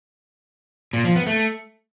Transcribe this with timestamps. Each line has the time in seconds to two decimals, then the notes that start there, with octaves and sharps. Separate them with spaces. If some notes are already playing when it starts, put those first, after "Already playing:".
0.93 A#2
1.04 F3
1.15 B3
1.27 A3